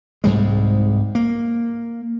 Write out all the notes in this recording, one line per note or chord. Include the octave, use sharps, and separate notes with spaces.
C2 G#2 G3 G#3
A#3